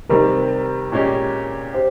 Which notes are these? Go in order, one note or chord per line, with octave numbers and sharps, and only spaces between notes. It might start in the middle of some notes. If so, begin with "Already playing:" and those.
C3 D#3 G3 C4 A#4
A#2 G#3 C#4 G4
G4 C5